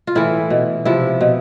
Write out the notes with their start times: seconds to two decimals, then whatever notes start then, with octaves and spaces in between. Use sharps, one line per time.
0.07 F4
0.15 A2 E3 E4
0.50 B2
0.85 C3 F3 E4
1.21 B2